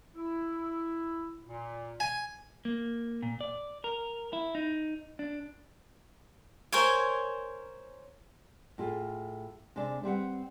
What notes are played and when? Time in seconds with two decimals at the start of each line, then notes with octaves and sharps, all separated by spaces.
0.14 E4
1.46 A#2
2.00 G#5
2.65 A#3
3.22 A#2
3.41 D5
3.84 A#4
4.33 E4
4.55 D#4
5.19 D4
6.72 A#4 C5 C#5 G#5
8.78 A2 F4 G#4
9.76 C3 G#3 D4
10.03 G3 C4 B4 F#5